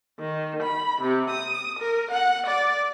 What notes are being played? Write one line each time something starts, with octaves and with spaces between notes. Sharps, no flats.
D#3
B5
C3
D#6
A#4
F#5
D5